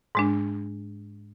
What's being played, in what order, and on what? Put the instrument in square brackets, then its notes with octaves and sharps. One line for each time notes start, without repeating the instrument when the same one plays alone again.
[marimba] G#2 G#3 D4